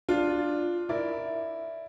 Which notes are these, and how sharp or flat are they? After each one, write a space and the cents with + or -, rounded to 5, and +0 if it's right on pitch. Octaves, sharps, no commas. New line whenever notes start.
D4 +5 F4 +0
E4 +0 A#4 +0 D5 +0